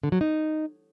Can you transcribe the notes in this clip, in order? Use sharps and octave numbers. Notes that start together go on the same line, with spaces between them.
D3
F#3
D#4